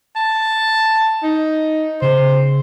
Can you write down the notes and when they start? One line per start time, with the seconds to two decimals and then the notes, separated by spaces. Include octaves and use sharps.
0.16 A5
1.23 D#4
2.02 C#3 C5